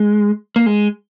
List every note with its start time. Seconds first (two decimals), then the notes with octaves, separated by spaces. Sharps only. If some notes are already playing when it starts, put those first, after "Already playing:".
Already playing: G#3
0.56 A#3
0.66 G#3